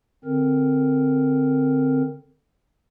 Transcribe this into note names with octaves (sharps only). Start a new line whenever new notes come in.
D3 C4 A#4